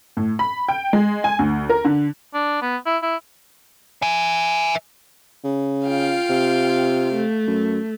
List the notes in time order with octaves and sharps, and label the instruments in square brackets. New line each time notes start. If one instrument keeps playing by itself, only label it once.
[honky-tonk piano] A2
B5
G5
G#3
G#5
D2
A#4
D3
[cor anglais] D4
B3
E4
E4
[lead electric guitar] E5 G#5
[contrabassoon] C#3
[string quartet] F4 F5 G5
[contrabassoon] C3
[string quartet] A3
[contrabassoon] F#2